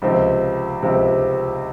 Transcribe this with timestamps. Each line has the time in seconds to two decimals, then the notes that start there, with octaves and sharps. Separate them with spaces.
0.02 C#2 C3 F3 C4
0.82 C#2 C3 F3 C4